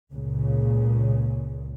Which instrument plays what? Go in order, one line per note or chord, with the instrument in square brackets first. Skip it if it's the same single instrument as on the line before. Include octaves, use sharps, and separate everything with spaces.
[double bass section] C#2 A#2 C#3